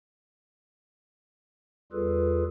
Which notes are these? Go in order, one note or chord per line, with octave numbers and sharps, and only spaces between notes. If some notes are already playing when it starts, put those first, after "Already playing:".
E2 G3 F4 G#4 A4 B4